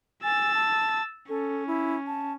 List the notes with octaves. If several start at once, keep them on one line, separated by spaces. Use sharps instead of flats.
G#5 E6 A6
A5
C#4 A4
E4
A5